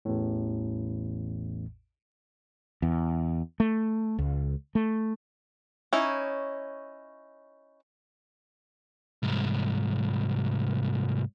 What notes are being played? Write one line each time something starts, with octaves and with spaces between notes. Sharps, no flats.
A1 E2 A2
E2
A3
C#2
A3
C#4 D#4 E4
C2 G#2